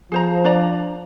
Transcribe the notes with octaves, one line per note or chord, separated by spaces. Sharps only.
F3 G#4 C5 A#5
D4 D5 A#5